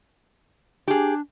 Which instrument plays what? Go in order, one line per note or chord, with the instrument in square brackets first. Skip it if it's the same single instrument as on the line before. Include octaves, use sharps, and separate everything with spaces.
[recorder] D4 [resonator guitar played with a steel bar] G4 G#4